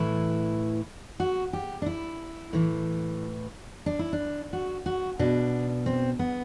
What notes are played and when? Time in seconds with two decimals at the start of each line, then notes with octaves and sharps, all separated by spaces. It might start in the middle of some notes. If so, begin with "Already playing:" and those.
Already playing: A2 E3 E4
1.20 F#4
1.53 G4
1.82 D4
1.86 E4
2.53 A2 E3
3.86 D4
3.99 E4
4.13 D4
4.53 F#4
4.86 F#4
5.19 B2 D4
5.86 C4
6.19 B3